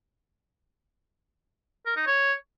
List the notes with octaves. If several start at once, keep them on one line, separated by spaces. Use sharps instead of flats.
A#4
D#4
C#5